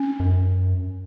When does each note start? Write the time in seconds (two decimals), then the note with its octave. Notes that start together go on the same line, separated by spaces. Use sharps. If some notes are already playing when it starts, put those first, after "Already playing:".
Already playing: C#4
0.20 F#2